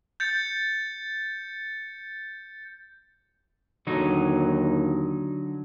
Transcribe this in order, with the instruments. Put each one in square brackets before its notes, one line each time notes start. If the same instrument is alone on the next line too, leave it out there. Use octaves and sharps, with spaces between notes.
[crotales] G6 A6 C#7
[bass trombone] D#2 [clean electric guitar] D3 F#3 D#4